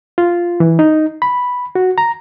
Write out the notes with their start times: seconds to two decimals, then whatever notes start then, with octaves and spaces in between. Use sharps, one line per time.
0.18 F4
0.60 E3
0.79 D#4
1.22 B5
1.75 F#4
1.98 A#5